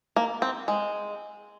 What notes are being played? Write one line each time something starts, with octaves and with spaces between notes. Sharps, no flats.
A#3
C4
G#3